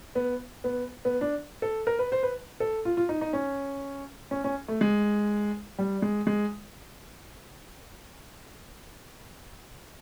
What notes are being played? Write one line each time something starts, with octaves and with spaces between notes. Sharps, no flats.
B3
B3
B3
D4
A4
A#4
B4
C5
B4
A4
F4
F4
D#4
D#4
C#4
C#4
C#4
A3
G#3
G3
G#3
G#3